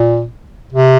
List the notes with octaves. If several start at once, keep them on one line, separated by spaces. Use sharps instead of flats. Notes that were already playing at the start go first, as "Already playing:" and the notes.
Already playing: A#2
C3